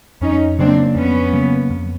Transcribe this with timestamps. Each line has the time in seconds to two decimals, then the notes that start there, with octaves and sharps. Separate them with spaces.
0.21 F2 C#4 D#4
0.59 C#3 F#3 A#3 C4 D4
0.96 F2 B3 C#4
1.33 C#3 F#3 A#3
1.70 F2